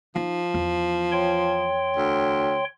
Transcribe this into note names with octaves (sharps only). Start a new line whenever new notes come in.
F3 D#4
E2
C#5 G5 C6
D2